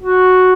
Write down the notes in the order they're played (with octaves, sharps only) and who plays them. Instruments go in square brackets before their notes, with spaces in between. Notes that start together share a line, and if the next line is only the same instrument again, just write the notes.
[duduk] F#4